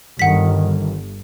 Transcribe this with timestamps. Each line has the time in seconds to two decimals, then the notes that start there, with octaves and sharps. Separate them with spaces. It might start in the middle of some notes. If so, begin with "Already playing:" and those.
0.19 G1 D#3 F#5 B6